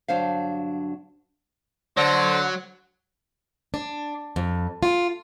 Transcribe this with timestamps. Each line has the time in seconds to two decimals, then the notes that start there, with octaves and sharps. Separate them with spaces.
0.08 G2 D3 F#3 D4 C5 F5
1.97 D3 F#3 C5
3.74 D4
4.36 F2
4.83 F4